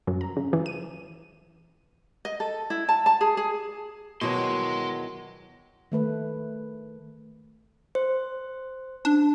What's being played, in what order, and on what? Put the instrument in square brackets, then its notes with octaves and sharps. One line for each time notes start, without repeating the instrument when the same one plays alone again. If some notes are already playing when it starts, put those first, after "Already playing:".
[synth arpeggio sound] F#2
A#5
C#3
E3
D#7
[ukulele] D#5
A4
E4
A5
A5
G#4
G#4
[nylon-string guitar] E2 D#3 F#3 [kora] B2 [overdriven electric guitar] D#5 C6
[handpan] D#3 A3 B4
[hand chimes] C5
[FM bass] D4